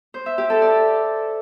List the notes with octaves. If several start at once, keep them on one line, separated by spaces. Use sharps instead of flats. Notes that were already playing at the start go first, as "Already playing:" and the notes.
C5
E5
G4
A4
D5